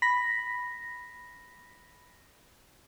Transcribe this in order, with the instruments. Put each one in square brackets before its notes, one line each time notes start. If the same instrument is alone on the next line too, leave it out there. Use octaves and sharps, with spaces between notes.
[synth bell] B5 A#6 B6